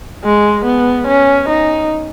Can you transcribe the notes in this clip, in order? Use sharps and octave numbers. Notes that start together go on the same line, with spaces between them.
G#3
B3
C#4
D#4